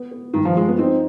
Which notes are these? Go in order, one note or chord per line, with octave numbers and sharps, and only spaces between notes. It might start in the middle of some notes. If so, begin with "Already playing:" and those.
Already playing: B3
B3
G2 D#3
F3
F3 G#3
B3
C4 D#4